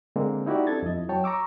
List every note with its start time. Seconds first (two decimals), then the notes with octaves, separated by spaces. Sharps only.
0.16 D3 G#3 A#3 C4
0.46 D#4 E4 F#4 G4 D5
0.67 C4 D4 A4 G#6 A6
0.83 F2 E4 D#5
1.09 F#3 C#5 G5 A5
1.24 A#5 C#6 D6 E6